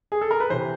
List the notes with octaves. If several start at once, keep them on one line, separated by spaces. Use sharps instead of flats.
G#4
A4
A#4
B4
C3 E3 C5